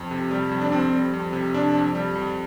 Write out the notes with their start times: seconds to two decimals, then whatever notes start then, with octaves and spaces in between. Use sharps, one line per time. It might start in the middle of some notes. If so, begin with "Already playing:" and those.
Already playing: F2
0.11 C3
0.31 G3
0.51 F2
0.61 D4
0.72 F2 C4
0.92 G3
1.13 F2
1.33 C3
1.54 F2 D4
1.75 F2
1.95 G3
2.15 F2